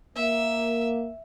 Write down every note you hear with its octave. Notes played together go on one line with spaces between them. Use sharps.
A#3 E5